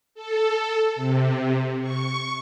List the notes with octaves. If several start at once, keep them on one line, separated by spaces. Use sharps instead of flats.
A4
C3
C#6